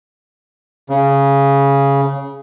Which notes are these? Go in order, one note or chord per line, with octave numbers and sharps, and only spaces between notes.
C#3